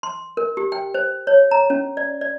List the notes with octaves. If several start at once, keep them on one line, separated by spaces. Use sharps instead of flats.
C6
A#4
G4
G5
C5
C#5
A#5
C#4
D5
D5